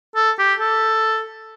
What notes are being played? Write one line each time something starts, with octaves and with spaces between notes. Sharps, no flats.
A4
G4
A4